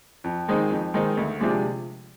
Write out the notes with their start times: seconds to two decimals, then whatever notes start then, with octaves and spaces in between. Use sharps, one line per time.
0.24 F2
0.48 D#3 G#3 C4 D#4
0.71 F2
0.94 D#3 G#3 C4 D#4
1.17 D2
1.41 C3 F3 G#3 D4